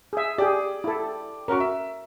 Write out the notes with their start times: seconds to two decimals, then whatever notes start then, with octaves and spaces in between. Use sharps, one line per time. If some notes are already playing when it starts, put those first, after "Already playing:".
0.13 G#4 E5
0.38 G4 G#4 D5 G5
0.84 E4 A4
1.48 C#4 F#4 A#4 C#6
1.60 E5